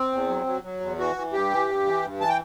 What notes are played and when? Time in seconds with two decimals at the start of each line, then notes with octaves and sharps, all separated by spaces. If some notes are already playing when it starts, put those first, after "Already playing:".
Already playing: C4
0.12 E2
0.29 F#3
0.46 F#3
0.63 F#3
0.80 E2
0.99 E3 F#4
1.16 E3
1.33 G2 G4
1.51 E3
1.69 G2
1.86 E3
2.03 G2
2.20 E3 A5
2.29 G5